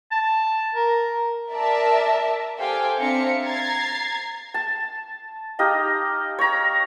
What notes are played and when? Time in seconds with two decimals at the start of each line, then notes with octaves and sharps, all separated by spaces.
0.12 A5
0.75 A#4
1.52 A#4 D5 E5 A5 A#5
2.59 G4 A4 C5 F5 G5 G#5
2.98 C4 D4 E5 F5 A#5 C#7
3.43 A#5 G#6 A6 C7
4.54 A5
5.59 D#4 G4 D#5 F5
6.39 C#5 A#5